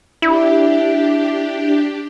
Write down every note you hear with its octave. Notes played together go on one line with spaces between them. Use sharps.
D4 E4 G4